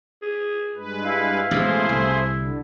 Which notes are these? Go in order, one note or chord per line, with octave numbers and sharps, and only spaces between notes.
G#4
G2 G#3 B4
E4 F5
A1 B2 G#3 A3 G#4 C5
C2
D3